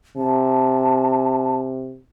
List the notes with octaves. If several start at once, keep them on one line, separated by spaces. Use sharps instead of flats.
C3 A5